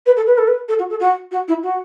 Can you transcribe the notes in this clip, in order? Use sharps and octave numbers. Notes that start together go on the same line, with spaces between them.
B4
A4
B4
A4
B4
A4
F#4
A4
F#4
F#4
E4
F#4